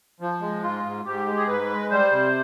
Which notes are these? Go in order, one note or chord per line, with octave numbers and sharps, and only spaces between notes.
F3
G#3
G#2 F4
G#2
G#2 G4
G#3
G#4
G#2 B4
G#3
G3 C5
C3